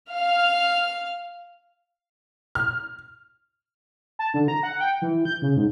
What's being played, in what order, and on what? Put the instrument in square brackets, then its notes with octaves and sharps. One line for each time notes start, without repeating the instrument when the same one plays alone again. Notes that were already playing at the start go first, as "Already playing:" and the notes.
[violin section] F5 F6
[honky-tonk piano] F6
[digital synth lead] A5
D3
A#5
F#5
G5
E3
G6
C#3
G#2